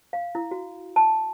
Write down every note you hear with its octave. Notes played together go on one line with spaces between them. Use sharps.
F5
E4
F#4
A5